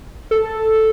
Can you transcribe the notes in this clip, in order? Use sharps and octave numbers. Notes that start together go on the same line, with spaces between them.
A4